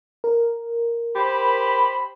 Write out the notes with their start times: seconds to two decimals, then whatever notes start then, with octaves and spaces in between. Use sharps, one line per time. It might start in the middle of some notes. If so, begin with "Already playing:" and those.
0.24 A#4
1.16 G4 C5 B5